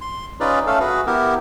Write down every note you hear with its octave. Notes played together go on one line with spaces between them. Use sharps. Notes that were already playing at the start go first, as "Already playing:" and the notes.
C6
C#4 D#4 F4 G#4 B4 D5
A3 C#4 A4 F5
F#4 G#4 B4
B3 E4 G4 A#4